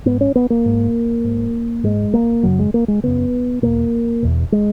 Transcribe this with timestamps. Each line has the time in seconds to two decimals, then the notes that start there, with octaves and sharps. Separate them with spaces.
0.05 G#2 B3
0.21 C#4
0.35 B3
0.50 A#3
0.66 G#2
1.24 G#2
1.83 G#2 G#3
2.14 A#3
2.43 F#2 C#3 F#3
2.59 G#3
2.74 A#3
2.88 G#3
3.03 F#2 C#3 B3
3.62 E2 B2 A#3
4.22 E2 B2
4.52 G#3